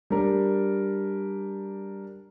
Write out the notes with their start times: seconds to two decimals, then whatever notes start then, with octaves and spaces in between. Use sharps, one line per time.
0.10 G3 D4 A#4